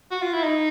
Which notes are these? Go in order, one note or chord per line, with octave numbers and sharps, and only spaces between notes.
F#4
F4
E4
D#4